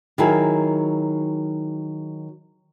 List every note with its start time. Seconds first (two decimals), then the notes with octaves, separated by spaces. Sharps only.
0.18 D#3 F#3 E4 G#4 A#4